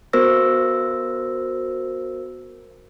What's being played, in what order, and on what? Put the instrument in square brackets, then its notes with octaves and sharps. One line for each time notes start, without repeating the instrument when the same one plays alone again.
[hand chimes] B3 F#4 A#4 C5 E6 A#6